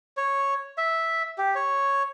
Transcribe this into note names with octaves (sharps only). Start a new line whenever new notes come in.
C#5
E5
G4
C#5